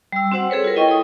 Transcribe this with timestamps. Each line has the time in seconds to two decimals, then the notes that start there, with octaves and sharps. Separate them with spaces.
0.12 G3 E6
0.32 C4 F#4 C5 F#5
0.50 C4 G#4 A4 B4 C#5
0.64 F4 A#4
0.76 E4 D#5 G5 C#6
0.88 A4 D#6